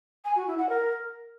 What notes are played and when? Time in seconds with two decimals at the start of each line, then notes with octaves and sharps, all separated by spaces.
0.25 G#5
0.36 F#4
0.47 E4
0.58 F#5
0.69 A#4